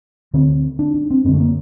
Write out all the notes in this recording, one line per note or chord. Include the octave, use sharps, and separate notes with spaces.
D2 D3 C4
D4
D4
C4
F#2 D3 A3 C4
A#3